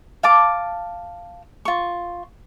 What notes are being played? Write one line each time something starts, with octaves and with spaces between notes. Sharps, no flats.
F5 A5 D6
F4 C#6